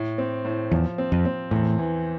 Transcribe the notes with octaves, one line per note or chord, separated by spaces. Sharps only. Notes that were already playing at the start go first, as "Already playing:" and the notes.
Already playing: A2
C4
A2
E2 F3
C4
F2
C4
E2 A2
E3